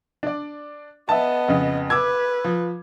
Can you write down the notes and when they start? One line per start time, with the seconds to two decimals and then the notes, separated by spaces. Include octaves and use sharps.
0.23 D4 D5
1.09 B3 D#5 E5 A5
1.48 F2 C#3
1.90 B4 D6 E6 G#6
2.44 F3